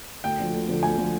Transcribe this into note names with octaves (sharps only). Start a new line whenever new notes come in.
D2 G5
D3 F3
D2
D3 F3
D2 G#5
D3 F3